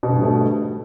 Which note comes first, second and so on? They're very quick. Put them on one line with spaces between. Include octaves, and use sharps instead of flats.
B2 D3 G#2 G3 A3